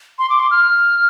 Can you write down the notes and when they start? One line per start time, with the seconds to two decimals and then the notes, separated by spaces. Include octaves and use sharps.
0.19 C6
0.30 D6
0.40 C6
0.51 F6